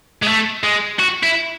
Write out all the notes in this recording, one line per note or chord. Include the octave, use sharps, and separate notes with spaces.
G#3
A3
G#3
F#4
E4